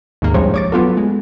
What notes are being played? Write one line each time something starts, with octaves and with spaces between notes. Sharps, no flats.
D#2 G#2 A#3
C2 G2 F3 G#3 C5 C#5
C#5 D6 A6
F#3 B3 F4 A4
G#3